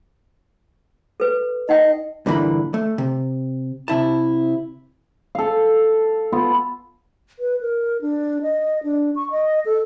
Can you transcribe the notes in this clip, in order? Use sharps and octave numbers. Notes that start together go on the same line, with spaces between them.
A4 B4
D#4 D#5 F#5 G5
G2 A#2 D3 E3 A#5 B5
A3
C3
C3 E4 A5
A4 F5
B3 F4
B4
A#4
D4
D#5
D4
C#6
D#5
A4